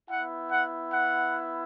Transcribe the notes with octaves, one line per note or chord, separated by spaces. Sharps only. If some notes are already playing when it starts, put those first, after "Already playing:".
B3 E4 F#5
F#5
F#5